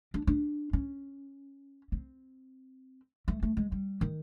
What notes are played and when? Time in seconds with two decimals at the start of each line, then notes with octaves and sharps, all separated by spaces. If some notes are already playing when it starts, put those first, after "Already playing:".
0.14 D4
0.27 D4
0.73 C#4
1.92 C4
3.28 A3
3.43 A3
3.57 G#3
3.72 G3
4.01 D#3